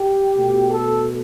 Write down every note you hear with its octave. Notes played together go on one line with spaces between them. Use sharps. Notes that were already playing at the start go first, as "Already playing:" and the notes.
Already playing: G4
B2 A3
A4